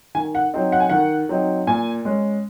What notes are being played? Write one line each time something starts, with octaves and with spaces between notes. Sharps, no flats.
D#3 G#5
F#5
F#3 C4 D#4
F#5
G#5
D#3 F#5
F#3 C4 D#4
A#2 G#5
G#3 C#4